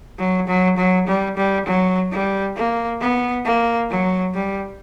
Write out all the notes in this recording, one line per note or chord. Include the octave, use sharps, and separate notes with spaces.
F#3
F#3
F#3
G3
G3
F#3
G3
A#3
B3
A#3
F#3
G3